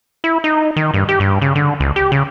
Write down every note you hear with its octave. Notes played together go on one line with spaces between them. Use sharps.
E4
D#4
D#3
G2
G4
G2
C#3
D3
C#2
G4
C#3